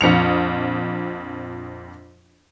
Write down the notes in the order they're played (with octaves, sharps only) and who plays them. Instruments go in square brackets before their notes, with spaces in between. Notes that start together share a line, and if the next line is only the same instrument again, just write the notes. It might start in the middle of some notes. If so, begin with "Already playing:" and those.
[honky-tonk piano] A#1 F2 C#7 F7